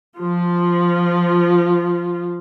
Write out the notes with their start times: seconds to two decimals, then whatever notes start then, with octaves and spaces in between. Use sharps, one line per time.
0.19 F3 F4